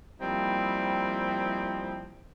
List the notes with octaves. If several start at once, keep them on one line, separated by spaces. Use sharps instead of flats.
F3 G3 A#3 C4 D#4 E4